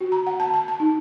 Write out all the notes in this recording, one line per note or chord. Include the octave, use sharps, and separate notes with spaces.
F#4
A#5
F#5
A5
A5
A5
D#4